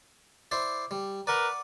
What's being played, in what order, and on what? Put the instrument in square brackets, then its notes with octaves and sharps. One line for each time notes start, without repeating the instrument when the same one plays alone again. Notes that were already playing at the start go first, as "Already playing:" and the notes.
[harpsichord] E4 C5 D5
G3
[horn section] A#4 B4 A#5 [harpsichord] D5 F#5